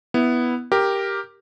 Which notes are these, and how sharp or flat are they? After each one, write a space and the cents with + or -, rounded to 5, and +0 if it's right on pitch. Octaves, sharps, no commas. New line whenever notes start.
B3 +0 E4 +0
G4 +0 A#4 +0